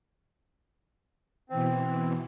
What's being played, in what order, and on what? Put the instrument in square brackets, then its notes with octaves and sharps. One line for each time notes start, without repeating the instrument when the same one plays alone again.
[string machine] B2 E3 [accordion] C4